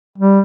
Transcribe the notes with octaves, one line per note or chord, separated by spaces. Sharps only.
G3